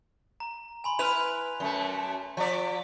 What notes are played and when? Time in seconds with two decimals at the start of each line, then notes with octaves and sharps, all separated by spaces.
0.40 A#5
0.84 G#5 B5 C6
0.99 E4 B4 F6 F7
1.60 F#2 A3
2.37 F3 D5